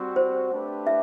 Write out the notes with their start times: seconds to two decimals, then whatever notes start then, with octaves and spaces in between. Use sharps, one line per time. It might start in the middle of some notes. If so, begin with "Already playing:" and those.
Already playing: G3 C4 F#4
0.16 C5
0.52 A3 D4 G4 B4
0.87 E5